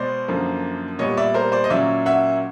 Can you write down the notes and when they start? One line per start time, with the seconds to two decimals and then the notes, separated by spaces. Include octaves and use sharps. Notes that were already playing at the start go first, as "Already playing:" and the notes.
Already playing: B2 G#3 B3 C5 D5
0.28 F#2 D3 F3 A#3
0.99 A#2 G3 B3 C#5 D#5
1.17 D5 E5
1.34 A#4 C5
1.52 C5 D5
1.64 D#5
1.70 A#2 F#3 A#3 C#4 D5 E5
2.06 E5 F#5